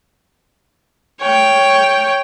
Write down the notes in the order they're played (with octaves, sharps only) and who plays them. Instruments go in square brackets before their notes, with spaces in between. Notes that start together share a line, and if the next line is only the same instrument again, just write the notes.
[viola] C#5 G5